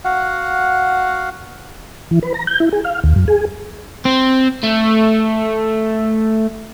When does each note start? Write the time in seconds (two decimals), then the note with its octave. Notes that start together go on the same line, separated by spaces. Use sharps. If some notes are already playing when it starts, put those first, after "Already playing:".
0.05 F#4 F5 F#5
2.11 E3
2.23 B4
2.34 A#5
2.47 G6
2.60 E4
2.73 G#4
2.85 F5
3.04 D#2
3.16 F#2
3.28 G#4
4.05 C4
4.63 A3